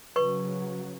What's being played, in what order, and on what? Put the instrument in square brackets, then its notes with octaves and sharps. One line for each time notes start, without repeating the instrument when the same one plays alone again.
[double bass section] C#3 F#3 [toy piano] B4 C#6